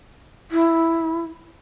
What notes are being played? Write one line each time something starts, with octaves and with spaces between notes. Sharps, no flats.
E4